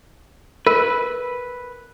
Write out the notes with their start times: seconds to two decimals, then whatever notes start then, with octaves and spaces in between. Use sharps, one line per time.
0.67 A#4 B4